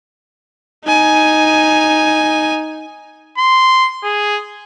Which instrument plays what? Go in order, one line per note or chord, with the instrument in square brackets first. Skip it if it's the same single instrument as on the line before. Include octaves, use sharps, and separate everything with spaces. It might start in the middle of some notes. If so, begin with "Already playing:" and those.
[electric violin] D#4 G#5
[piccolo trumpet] C6
G#4